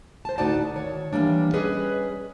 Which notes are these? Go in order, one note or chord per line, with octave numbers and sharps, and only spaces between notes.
C5 A5
D2 A2 D#4 F#4 D5 A5
D#3 C#5
E3 F#3 G3 A#3 D4
G3 C#4 G#4 B4 D#5